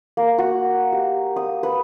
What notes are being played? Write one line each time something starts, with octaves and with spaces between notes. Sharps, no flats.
A#3
F#4
G4
D#6
B4